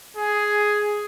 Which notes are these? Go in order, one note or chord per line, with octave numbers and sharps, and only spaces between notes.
G#4